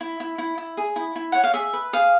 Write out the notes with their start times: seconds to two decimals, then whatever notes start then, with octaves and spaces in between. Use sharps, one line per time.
0.01 E4
0.20 E4
0.38 E4
0.58 E4
0.77 G#4
0.96 E4
1.16 E4
1.32 C#5 F#5
1.44 F5
1.54 G#4 E5
1.73 B4
1.93 G#4 F5